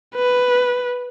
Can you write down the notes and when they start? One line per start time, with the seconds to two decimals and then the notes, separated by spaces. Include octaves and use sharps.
0.15 B4